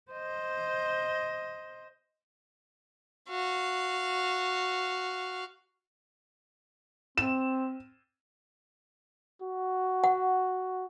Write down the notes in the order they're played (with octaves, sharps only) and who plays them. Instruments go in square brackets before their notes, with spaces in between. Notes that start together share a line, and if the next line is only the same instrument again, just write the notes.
[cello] C5 D#5
[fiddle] F#4 F5
[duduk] C4 [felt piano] E7
[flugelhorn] F#4
[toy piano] F#5